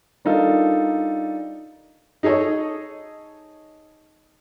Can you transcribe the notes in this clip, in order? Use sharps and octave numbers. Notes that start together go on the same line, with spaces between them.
G3 D4 D#4 F4 A4 A#4
D#4 G#4 A4 C#5 D#5